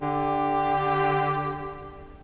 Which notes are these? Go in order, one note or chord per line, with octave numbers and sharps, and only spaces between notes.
D3 G4